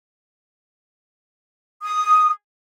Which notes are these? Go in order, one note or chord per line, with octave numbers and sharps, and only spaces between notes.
D#6